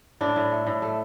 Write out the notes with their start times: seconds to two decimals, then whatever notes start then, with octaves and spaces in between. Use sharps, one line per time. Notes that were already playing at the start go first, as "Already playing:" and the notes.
0.21 A2 D4
0.36 A2
0.52 A3
0.67 A2
0.82 A3